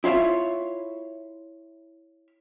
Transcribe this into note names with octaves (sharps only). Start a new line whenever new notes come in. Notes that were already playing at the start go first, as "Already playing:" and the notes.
E4 F4 C#5 E5